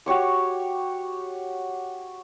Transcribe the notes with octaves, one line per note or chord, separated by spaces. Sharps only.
F#4 G4 C#5 D6